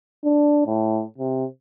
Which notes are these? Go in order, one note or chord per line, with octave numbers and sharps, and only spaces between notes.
D4
A2
C3